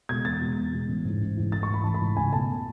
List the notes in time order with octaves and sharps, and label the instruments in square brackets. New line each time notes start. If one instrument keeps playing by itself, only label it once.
[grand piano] B2 G#3 G#6
E2 A6
B2 G#3
E2
B2 G#3
A1
G#2 E3
A1
G#2 E3
A1 A6
C#6
G#2 E3 B5
A1 A5
B5
G#2 E3
C#2 G#5
B2 A3 A5